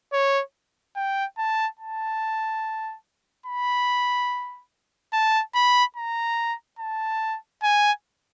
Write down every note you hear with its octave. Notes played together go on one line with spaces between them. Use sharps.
C#5
G5
A5
A5
B5
A5
B5
A#5
A5
G#5